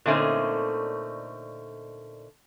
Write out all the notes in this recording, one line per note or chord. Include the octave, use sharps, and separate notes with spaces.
A#2 D3 A3 C4 C#4 D#4